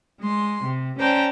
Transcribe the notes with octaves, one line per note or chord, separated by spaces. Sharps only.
G#3 C6
C3
C#4 C5 D5 G5 A5 A#5